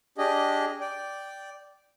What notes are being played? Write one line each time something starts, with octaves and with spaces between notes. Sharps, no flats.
D4 G4 G#4 D#5
D5 G5